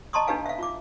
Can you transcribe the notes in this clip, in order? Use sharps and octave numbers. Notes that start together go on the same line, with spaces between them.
D#5 A5 A#5 C6 C#6 D#6
D4 D#4 G4 B4 F5 G#5
E5 F5
F4 D6